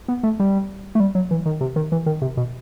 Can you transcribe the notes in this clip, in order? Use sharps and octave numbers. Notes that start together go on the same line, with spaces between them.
B3
A3
G3
A3
G3
F#3
E3
D#3
C3
D#3
E3
D#3
C3
B2